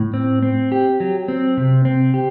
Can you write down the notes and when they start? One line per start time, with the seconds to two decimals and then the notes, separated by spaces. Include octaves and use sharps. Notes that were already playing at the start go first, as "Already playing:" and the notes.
Already playing: A2
0.14 C4
0.43 C4
0.72 G4
1.00 F#3
1.28 C4
1.57 C3
1.85 C4
2.14 G4